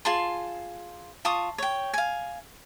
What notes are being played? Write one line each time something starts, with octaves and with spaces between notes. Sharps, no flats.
F4 G#4 A5 C6
F4 A5 C#6 D#6
C#5 G5
F5 G#5